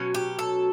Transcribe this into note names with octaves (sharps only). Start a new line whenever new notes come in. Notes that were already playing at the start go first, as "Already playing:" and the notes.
Already playing: B2 F#3 C#4
G4
A4